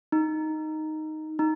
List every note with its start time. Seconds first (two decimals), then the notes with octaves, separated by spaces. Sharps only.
0.12 D#4
1.39 D#4